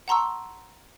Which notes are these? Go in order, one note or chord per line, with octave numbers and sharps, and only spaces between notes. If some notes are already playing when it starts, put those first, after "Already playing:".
F#5 A5 A#5 C6 C#6 E6